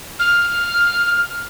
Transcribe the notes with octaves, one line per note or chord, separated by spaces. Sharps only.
F6